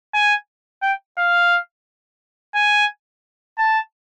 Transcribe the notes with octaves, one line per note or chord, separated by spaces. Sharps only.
G#5
G5
F5
G#5
A5